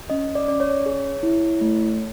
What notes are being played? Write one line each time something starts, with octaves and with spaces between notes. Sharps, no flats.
C#4 D#5
D5
C#4 D5
C#5
G#4
E4
A3